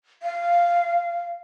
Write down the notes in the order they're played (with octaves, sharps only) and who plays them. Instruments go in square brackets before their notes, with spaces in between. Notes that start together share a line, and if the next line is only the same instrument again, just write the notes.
[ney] F5